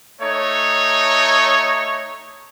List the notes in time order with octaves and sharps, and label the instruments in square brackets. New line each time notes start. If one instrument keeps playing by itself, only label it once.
[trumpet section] A3 D#4 C#5